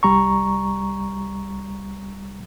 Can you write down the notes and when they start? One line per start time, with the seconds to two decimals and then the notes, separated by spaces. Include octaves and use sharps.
0.03 C2 G3 A#5 C#6